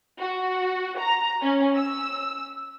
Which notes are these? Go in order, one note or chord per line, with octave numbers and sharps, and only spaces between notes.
F#4
A#5
C#4
E6